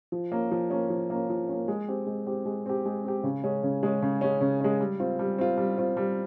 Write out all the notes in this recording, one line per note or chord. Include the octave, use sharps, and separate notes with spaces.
F3
A#3 C#4
F3
A#3 C#4
F3
A#3 C#4
F3
A#3 C#4
G#3
C4 G4
G#3
C4 G4
G#3
C4 G4
G#3
C4 G4
C#3
G#3 C#4
C#3
G#3 C#4
C#3
G#3 C#4
C#3
G#3 C#4
G3
C4 F4
G3
C4 F4
G3
C4 F4
G3